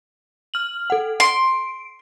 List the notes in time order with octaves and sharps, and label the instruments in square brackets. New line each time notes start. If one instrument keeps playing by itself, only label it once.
[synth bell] F6 F#7
A4 F#5
[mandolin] C6 [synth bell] D7